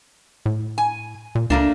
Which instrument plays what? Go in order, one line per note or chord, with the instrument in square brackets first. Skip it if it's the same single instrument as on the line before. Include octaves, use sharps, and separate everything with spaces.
[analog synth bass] A2
[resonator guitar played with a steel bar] G#5
[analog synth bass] A#2
[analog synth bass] C#2 [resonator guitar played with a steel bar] A3 A#3 D4